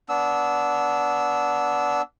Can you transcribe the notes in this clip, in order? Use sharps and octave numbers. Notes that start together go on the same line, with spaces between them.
B3 D4 E6